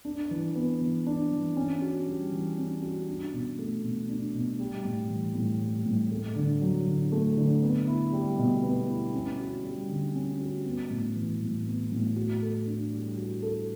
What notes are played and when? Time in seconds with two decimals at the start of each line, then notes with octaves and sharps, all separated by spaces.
0.05 D4
0.31 E3
0.56 B3
0.81 E3
1.07 D4
1.31 E3
1.57 C#4
1.82 F#4
2.07 G3
2.32 E3
2.58 C#4
2.82 F#4
3.09 D4
3.33 B2
3.59 A3
3.84 B2
4.09 D4
4.34 B2
4.59 G3
4.85 A2
5.10 E3
5.35 A2
5.61 G3
5.86 A2
6.11 A3
6.36 D3
6.62 F#3
6.87 D3
7.12 A3
7.38 D3
7.62 B3
7.87 E4
8.13 G3
8.38 B2
8.63 B3
8.89 E4
9.14 C#4
9.39 F#4
9.64 G3
9.89 D3
10.15 C#4
10.40 F#4
10.65 B3
10.90 A2
11.15 E3
11.41 A2
11.67 B3
11.92 A2
12.16 F#4
12.42 A4
12.67 D4
12.92 G3
13.17 F#4
13.43 A4